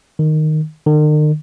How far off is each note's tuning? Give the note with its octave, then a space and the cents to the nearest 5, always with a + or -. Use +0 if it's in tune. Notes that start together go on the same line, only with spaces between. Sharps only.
D#3 -10
D#3 -45